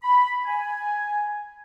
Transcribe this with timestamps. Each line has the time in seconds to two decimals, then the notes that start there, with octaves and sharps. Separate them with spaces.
0.03 B5
0.45 G#5